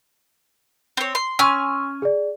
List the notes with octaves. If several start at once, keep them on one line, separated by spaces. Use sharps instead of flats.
C4 C#5
C6
C#4 G#5 C6 C#6 E6 F6
G#4 D5